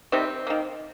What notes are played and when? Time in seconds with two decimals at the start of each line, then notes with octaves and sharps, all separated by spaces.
0.12 C3 D#3 G3 C4
0.47 D#3 A#3